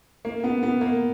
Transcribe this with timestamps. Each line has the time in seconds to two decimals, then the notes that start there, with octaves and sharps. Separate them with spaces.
0.25 A#3
0.44 B3
0.63 B3
0.81 A#3